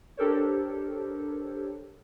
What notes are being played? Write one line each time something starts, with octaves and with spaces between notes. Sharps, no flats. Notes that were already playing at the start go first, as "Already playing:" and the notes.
D4 G4 A4 A#4 C5 C#5